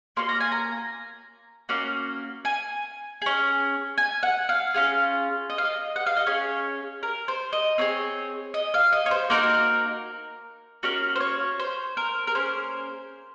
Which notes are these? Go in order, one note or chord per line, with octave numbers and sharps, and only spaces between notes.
A#3 C#4 F#4 C6
A#5
G#5
A#5
A#3 C#4 F#4
G#5
C#4 G#4
G#5
F#5
F5
C#4 F4 G#4
D#5
F5
D#5
F#5
F5
D#5
C#4 G#4 C#5
A#4
C5
D#5
C4 D#4 G#4 C#5
D#5
F5
D#5
C#5
C5
A#3 D#4 F#4 A#4
A#3 C#4 F#4
C5
C#5
C5
A#4
A#4
A#3 C#4 G#4 C5